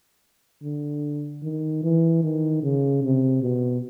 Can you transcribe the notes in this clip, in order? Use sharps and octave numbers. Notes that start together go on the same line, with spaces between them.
D3
D#3
E3
D#3
C#3
C3
B2